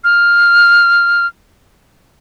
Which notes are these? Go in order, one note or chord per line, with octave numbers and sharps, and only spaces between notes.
F6